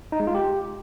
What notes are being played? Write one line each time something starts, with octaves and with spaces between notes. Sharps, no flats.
D#4
G#3
F4
G4